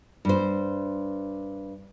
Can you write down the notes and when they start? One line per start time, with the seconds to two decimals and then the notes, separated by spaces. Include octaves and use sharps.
0.25 G2 C5